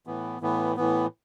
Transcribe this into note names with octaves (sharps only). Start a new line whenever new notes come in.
A2 E3 B3
A2 E3 B3
A2 E3 B3